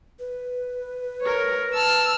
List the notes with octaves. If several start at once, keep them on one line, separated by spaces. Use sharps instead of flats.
B4
A#4 C#5
A5 E6 F6